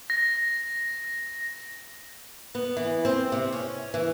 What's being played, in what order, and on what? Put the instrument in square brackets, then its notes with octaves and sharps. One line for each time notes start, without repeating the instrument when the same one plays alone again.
[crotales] A#6
[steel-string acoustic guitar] B3
E3
C4
C3
C#4
E3